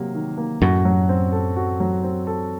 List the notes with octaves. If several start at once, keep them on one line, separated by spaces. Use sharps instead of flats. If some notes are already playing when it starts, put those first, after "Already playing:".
Already playing: C3 F#3 A#3
D#3
A#3
F#2 A2 F#4
F#3
C4
A4
F#4
F#3
C4
A4